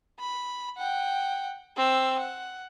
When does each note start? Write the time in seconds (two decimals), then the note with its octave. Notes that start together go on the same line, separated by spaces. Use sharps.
0.19 B5
0.77 F#5 G5
1.77 C4 E6
2.19 F#5